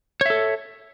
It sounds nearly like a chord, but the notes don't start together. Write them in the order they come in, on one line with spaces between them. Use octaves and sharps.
C#5 E5 A4